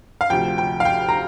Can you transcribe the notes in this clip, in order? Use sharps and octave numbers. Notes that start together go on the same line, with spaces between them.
F5
D2 C3 F3 G5
G5
F5
G5
A#5